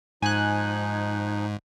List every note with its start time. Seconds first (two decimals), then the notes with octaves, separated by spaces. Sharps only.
0.22 G#2 F3 D#4 G#5 F#6